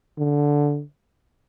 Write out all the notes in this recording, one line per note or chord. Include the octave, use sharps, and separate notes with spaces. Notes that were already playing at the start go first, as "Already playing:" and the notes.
D3